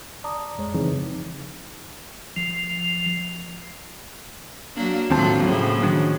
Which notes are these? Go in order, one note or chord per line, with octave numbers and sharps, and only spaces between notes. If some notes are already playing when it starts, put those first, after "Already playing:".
D5 A5 A#5 D6 D#6
F2 G#3 C#5
C#3 E3 F3 C4 D#4 G#4
F3
F#3 A#3 D4
D#2 A2 F#3 C4 F4 A5
A2 C#3 F3 F#3 A#3
D#3 F#3 D4